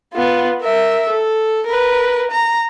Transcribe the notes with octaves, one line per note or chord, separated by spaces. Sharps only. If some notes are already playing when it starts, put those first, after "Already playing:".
B3 F4
A#4 E5
A4
A#4 B4
A#5